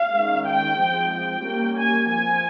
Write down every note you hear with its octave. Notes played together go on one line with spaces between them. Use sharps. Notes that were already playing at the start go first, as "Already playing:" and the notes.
Already playing: F5
D#3 G#3 C#4
G5
F3 G#3 C4
G5
G3 A#3 C#4
G#5
F3 C4 G#5